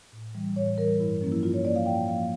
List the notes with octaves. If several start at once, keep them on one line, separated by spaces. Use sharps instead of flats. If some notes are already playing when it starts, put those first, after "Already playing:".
A2
E3 G3
A2 C#5
E3 G3 A#4
G2 E4
F3 A#3 C#4
E4
G2 F4
C#5
F3 A#3 D5
F5
A2 G5
F3 A#3 F5